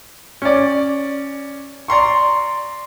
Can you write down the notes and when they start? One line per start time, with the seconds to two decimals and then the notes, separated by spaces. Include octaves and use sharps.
0.42 C#4 D5
1.88 D5 A#5 C6 C#6